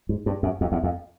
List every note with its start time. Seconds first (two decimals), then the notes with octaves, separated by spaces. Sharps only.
0.09 G#2
0.26 G2
0.43 F#2
0.61 F2
0.72 E2
0.84 F2